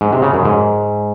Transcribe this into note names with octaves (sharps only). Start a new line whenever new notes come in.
G#2
C3
C#3
F#2
G#2